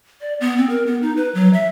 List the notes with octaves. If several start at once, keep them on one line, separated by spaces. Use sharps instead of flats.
D5
B3
C4
A#4
B3
D#4
B4
F#3
E5